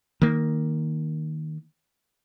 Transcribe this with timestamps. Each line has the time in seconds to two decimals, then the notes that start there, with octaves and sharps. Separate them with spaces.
0.22 D#3 A#3